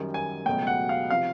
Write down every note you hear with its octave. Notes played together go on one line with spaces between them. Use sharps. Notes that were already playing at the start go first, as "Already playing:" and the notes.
Already playing: F#2 D#3 G3
G#5
C#2 B2 F#3 A3 G5
F#5
F5
C3 F3 F5